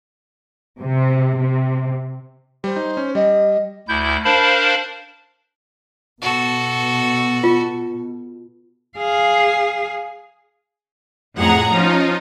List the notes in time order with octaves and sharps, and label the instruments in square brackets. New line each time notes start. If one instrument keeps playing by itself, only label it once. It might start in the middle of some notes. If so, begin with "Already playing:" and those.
[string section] C3
C3
[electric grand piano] G3 [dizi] C5
[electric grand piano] D#4
C#4
[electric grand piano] G3 [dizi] D#5
[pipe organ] D2 E4 G6
D4 A#4 C5 F5 A5 B5
[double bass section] B2 [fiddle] F#4 A4
[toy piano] F4
[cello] G#4 F5
[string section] F2 A2 G#4 F#5 A#5
F3 C#4 D#4 F4